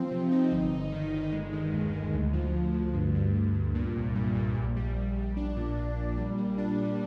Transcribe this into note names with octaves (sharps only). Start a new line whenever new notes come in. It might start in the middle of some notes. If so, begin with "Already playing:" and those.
Already playing: F3 C4
C3
D#4
G1
G1
D#3
G1
G#3
D#3
D#2
D#3
D2
F3
D2
D2
G2
G2
G2
G2
A#2
C2
G3
A#2
A#1
G3
A#1
A#1
D4
A#2
A#2
A#2
G3
G3
D4
G3